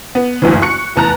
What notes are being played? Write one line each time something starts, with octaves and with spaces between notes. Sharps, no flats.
B3
F#1 D2 G2 E3
C#6 F#6 C#7
F1 E2 A5 A#5 F#6